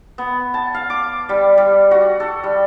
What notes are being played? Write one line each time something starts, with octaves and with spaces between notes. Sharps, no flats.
B3
A5
F5
D6
G3
G3
F#4
A4
G3